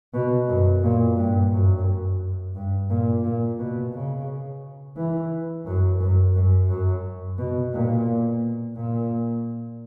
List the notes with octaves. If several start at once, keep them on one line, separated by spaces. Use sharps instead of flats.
B2
F#2
A#2
G2
F#2
G2
A#2
A#2
B2
C#3
E3
F#2
F#2
F#2
F#2
B2
A#2
A#2